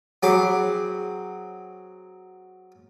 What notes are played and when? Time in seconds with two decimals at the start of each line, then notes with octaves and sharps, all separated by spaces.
0.23 F#3 C4 G#4 B5 D6